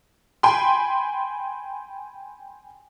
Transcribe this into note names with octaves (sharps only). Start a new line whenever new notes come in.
G5 G#5 B5 C6